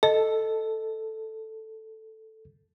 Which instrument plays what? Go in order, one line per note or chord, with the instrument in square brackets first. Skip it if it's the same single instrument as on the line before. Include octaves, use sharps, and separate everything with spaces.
[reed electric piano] A4 [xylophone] D#5